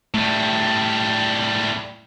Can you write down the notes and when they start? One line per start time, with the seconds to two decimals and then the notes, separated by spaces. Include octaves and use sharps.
0.14 A2 G3 A3